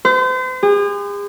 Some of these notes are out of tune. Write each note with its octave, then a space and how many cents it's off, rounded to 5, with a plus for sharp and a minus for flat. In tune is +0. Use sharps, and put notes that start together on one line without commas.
C5 -40
G#4 -40